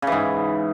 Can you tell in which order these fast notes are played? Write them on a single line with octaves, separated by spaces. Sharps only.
C#3 E3 G#2